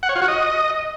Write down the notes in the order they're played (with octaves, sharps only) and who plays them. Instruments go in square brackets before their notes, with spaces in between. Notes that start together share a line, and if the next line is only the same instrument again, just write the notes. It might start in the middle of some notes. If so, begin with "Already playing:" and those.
[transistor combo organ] F#5
C#5
F4
F#4
D#5